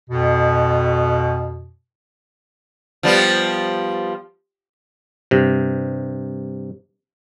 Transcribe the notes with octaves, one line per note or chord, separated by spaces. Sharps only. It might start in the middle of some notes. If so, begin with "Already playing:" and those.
F2 B2
F3 G3 B3
G2 C3